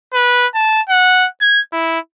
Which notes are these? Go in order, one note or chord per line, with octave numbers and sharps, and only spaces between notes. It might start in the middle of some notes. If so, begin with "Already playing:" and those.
B4
A5
F#5
G#6
E4